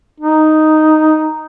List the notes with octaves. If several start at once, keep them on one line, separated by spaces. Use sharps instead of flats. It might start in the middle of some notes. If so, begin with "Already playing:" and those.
D#4